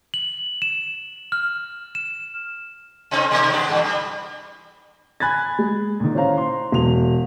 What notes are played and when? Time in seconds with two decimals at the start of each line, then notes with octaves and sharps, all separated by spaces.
0.14 F#7
0.62 E7
1.32 F6
1.95 E7
3.11 C3 C4 D#4
3.31 B2 D#3 A#3
3.52 B3 D4 G4
3.68 G2 D3 E3
3.84 G3
5.20 G#5 B5 F#6 G#6 A6
5.59 G#3
6.00 A#2 D#3
6.15 C#4 E4 C5 F5 A#5
6.37 C6
6.72 E1 F7